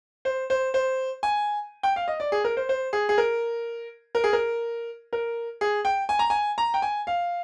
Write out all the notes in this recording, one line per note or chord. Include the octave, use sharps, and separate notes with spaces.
C5
C5
C5
G#5
G5
F5
D#5
D5
G#4
A#4
C5
C5
G#4
G#4
A#4
A#4
G#4
A#4
A#4
G#4
G5
G#5
A#5
G#5
A#5
G5
G#5
F5